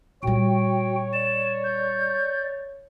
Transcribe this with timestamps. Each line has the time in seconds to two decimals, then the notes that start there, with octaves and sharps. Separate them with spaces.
0.23 A#2 G3 F#4 C#5 G5
1.13 D5 E7
1.64 G6